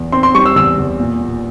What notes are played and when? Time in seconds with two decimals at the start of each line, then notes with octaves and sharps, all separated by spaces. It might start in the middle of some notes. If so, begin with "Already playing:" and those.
Already playing: E2
0.12 C4 C6
0.23 C6
0.34 G3 C#6
0.46 E6
0.56 E2 E6
0.78 E2
1.00 A#2
1.21 A#2